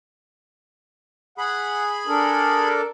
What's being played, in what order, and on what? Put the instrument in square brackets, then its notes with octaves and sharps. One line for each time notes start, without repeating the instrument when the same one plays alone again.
[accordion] G#4 B5 [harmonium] F#5
[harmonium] D4 A4 A#4